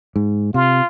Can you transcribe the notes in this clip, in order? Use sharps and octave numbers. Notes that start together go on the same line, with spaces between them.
G#2
C3 F4